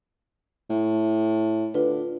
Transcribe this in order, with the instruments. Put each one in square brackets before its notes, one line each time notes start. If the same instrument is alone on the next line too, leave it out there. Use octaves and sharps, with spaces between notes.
[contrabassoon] A2
[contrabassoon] D3 [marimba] F4 B4